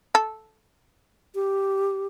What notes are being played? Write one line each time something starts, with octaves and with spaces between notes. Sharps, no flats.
A4
G4